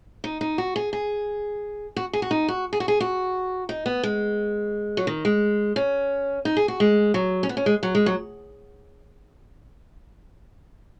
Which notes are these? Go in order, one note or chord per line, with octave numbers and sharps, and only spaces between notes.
D#4
D#4
F#4
G#4
G#4
F#4
G#4
F#4
D#4
F#4
G#4
F#4
G#4
F#4
D#4
B3
G#3
F#3
D#3
G#3
C#4
D#4
G#4
F#4
G#3
F#3
C#4
B3
C#4
G#3
F#3
G#3
F#3